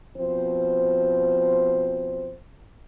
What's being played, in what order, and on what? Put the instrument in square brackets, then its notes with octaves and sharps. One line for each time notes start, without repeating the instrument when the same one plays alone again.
[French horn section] B2 F3 C4 C5